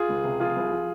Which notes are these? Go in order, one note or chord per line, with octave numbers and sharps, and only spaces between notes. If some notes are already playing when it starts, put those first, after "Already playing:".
Already playing: F4 G#4
C#2
C3
F3 F4 G#4
C2
F3